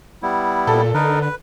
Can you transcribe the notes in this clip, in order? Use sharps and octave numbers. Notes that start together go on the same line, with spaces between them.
G3 B3 E4
A#2 A4
D3 D#4 A#4 B4
B4